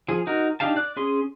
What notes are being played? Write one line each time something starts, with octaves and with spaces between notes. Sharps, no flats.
F3 G#4
D#4 F#4 A#4
D4 D#4 G4 F5 A5
D5 F#6
C#4 G#4 C6